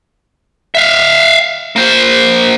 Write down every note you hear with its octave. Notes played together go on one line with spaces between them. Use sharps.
E5 F5
A#3 C5